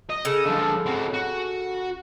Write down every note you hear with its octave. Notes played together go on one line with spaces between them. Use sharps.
D#5
C#3 A4
D3 F3
C4 F#4
F#4